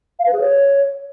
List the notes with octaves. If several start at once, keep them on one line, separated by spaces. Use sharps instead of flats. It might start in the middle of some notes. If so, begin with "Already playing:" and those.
F5
B4
G#4
C#5